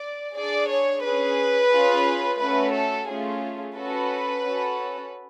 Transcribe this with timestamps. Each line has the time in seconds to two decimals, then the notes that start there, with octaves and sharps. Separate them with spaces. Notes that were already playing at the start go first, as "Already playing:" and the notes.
Already playing: D5
0.34 D4 G#4 D5
0.68 C#5
1.02 C#4 G#4 B4
1.71 C#4 F4 G#4
2.39 A3 C#4 F#4 B4
2.74 A4
3.08 A3 C#4 F4 G#4
3.76 C#4 F#4 A4 B4
4.45 C#4 F#4 A4